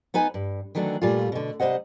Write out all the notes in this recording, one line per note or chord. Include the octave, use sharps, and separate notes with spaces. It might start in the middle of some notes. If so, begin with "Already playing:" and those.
B3 D#4 B4 G#5
G2
D#3 E3 F#3 A3 D4
A#2 G3 A3 F4
B2 D3
C3 G3 C5 D#5 F#5